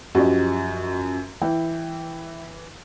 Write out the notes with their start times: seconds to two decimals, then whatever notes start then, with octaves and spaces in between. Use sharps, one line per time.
0.15 F#2 F3 F#4 G4 D#5
1.42 E3 E4 G5